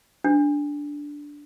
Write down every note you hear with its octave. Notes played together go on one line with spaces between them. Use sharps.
D4